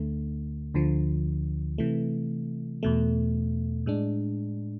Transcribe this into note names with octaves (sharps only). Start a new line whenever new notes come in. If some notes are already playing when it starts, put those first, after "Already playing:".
Already playing: D2 D3 A3
D2 D3 F3
C3 E3 A3
E2 B2 A3
A2 G#3 D4